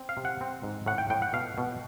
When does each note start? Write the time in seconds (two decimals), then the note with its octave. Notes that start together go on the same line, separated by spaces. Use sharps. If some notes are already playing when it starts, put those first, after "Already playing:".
Already playing: C4
0.09 F5
0.17 C3
0.25 F#5
0.41 C4
0.63 G#2
0.86 A2 F#5
0.98 G5
1.10 A2 G5
1.22 F#5
1.33 B2 F5
1.58 B2